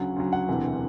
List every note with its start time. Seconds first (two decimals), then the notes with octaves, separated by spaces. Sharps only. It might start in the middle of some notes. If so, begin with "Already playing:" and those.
Already playing: D2 C#3 F#3 F#5
0.16 D2 C#3 F#3
0.33 F#5
0.48 E1 D2 C3 E3